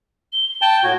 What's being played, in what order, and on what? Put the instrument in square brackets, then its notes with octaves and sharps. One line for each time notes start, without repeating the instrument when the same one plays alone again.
[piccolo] G7
[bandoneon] G5 A5
[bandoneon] A2 F#4 [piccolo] G#6